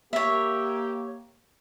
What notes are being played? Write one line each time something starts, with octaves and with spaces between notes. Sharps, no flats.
A#3 G4 C#5 E5